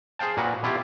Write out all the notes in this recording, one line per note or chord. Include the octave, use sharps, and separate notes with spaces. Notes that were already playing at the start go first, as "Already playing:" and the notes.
G#4 C5 F5 G5 A5
A#2 F#4 A#4 B4 F#5
B2 E4 F4 G4